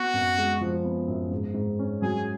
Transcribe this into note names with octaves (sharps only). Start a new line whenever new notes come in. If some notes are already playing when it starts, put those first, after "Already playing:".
Already playing: B3 F#4
F#2
G#3
F3
B3
F#2
G#2
G#2
C#4
F#3 G#4